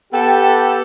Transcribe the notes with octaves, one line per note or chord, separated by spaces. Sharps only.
B3 G4 A4 G5